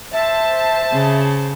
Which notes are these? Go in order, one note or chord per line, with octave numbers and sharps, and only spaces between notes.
C5 E5 A5
C#3